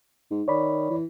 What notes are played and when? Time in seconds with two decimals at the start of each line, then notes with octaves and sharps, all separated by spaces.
0.31 G#2 D#4
0.48 D#3 C#5 D5 B5
0.90 E3